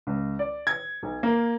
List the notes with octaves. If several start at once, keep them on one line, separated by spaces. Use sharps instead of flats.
C#2
D5
G#6
B1
A#3